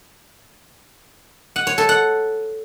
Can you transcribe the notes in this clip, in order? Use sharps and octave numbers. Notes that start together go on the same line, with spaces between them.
F#5
C#5
A4
F#5